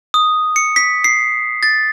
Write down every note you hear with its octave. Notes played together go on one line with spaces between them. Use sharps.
D#6
C#7
B6
C7
A6